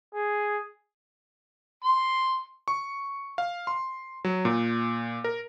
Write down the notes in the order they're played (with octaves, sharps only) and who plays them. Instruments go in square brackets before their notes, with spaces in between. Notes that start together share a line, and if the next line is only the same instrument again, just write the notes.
[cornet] G#4
[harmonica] C6
[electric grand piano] C#6
F5
C6
F#3
A#2
A#4